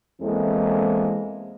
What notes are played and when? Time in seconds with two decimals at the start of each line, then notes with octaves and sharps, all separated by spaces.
0.22 E2 E3 G#3 A#3 C4 A4